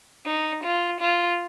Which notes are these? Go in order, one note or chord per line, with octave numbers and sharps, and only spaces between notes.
D#4
F4
F4